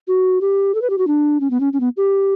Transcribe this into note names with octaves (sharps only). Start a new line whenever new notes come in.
F#4
G4
A4
B4
G4
F#4
D4
C#4
B3
C#4
C#4
B3
G4